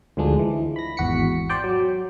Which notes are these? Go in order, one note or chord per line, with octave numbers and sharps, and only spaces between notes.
D2 G#2 D3 F3 G#3 D4
E3
B5 A#6
G#1 E2 F#4 B6 C#7
C5 D5 G5
F#3